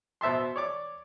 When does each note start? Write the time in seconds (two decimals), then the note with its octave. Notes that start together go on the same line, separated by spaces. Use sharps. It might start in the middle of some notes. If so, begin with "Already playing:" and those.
0.21 B2 C5 E5 A5 C6
0.56 C#5 D5 D6